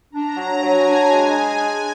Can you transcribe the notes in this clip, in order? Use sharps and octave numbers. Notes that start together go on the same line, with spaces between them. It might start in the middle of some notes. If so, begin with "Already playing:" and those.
D4 A#5
F#3
F#3 G#5
D4
G#3 G#5
G#4
D4